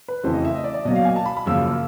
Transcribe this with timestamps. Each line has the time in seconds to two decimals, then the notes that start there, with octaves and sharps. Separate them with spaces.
0.08 B4
0.23 F2 C#3 E3 A3 C5
0.34 D#5
0.45 E5
0.55 D#5
0.64 D5
0.74 D5
0.85 B2 F#3 A#3 D#5
0.96 F5
1.05 G#5
1.16 A5
1.26 B5
1.37 B5
1.46 F#2 C#3 F3 A#3 E6